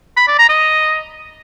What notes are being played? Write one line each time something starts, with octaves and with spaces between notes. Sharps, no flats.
B5
D5
A#5
D#5